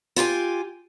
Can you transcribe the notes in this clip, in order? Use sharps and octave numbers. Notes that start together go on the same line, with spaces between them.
E4 F4 G4 G#5